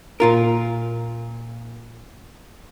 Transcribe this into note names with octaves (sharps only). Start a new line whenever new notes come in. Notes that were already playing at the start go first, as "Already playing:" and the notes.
A#2 F4 A#4